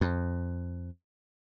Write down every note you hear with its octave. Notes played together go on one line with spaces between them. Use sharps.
F2